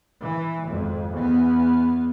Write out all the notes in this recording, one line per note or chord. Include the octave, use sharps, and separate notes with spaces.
E3
G#1 F2
E2 B3